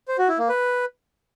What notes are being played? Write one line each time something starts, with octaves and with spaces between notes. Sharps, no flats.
C5
F#4
E4
A#3
B4